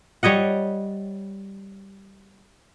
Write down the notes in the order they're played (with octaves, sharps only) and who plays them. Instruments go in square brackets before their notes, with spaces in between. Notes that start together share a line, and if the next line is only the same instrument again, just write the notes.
[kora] G3 C#5 D#5 F#5